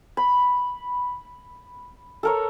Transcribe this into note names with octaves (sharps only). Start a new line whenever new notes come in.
B5
A4 A#4 C#5